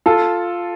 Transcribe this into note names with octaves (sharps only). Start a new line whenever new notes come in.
F4 A4